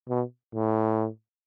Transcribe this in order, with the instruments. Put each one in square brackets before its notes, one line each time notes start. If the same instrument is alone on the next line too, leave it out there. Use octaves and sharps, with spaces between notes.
[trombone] B2
A2